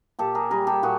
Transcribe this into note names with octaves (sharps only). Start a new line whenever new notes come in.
A#2 G4 A4
G#4 A#4
G3 G#4 A#4
G4 A4
A#2 F#4 G#4